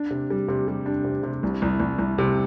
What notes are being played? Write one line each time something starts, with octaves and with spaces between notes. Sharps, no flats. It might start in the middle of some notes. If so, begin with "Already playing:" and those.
Already playing: D4
C3
G3
C3
G3
D4
C3
C3
C2
C2
C2
C2
C3